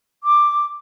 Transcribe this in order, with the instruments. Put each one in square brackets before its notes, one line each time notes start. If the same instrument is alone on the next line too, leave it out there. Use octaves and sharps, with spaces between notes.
[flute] D6